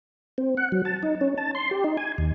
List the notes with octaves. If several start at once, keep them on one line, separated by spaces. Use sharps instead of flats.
C4
F#5
F#3
A5
D#4
C#4
A5
C6
G4
D#4
G#5
D#2